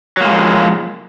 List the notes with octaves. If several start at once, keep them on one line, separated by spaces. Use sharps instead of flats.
F3 F#3 G#3 A#3